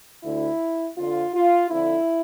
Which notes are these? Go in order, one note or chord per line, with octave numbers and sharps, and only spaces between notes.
D2 D3 E4
F2 D3 F4
F4
F2 D3 E4